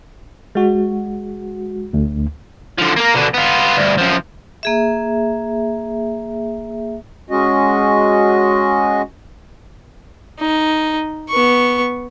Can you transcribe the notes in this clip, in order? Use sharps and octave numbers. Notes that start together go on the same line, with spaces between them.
G#3 F#4
D2
D3 F3
A#3 A#4
B2 D3
B3 F4
D2 G2
F#2 F3
A#3 G#4 E5
G#3 C#4 F#4 D#5
D#4
B3 C#6